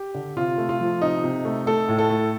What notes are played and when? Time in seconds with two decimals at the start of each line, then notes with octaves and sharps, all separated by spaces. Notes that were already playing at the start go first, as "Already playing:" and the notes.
Already playing: G4
0.15 D3
0.36 C3 F4
0.58 A3
0.69 F4
0.80 F3
1.01 C3 D#4
1.24 C3
1.45 A3
1.66 A3 A4
1.88 A2
1.98 A4
2.10 A3